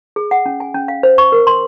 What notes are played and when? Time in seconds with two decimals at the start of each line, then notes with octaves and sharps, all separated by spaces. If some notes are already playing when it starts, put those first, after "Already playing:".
0.16 G#4
0.31 F#5
0.46 C#4
0.60 G#5
0.75 C#4
0.88 F5
1.03 C5
1.18 C#6
1.32 A#4
1.47 C6